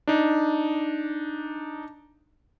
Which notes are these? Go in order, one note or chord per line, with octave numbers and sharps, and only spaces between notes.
D4 D#4